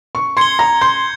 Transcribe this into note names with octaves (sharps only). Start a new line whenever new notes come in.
C#6
C6 G#6 C#7 G7
A#5
C6 G6